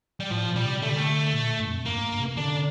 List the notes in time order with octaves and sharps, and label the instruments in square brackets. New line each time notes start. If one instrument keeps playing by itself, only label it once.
[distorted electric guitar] G3
[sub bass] A2 [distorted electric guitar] F3
[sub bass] A#2
[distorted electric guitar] G3
[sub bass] C3
[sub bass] D3 [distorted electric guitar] A3
[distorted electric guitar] G3
A3
[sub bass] A#2
G2
F2
[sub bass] G2 [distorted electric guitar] A#3
[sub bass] G2
C3
[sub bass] D3 [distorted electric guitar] D4